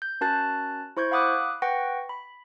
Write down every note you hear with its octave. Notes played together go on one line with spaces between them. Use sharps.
G6
C#4 F#4 A#4 A5 F#6 A6
E4 C5 C#6 G6 G#6
F5 F#5 B5 D6 D#6 F#6
B4 F#5 G5 C#6 A#6
B5